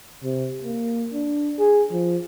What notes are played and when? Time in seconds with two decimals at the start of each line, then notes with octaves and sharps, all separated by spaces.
0.24 C3
0.63 A#3
1.13 D4
1.59 G#4
1.92 F3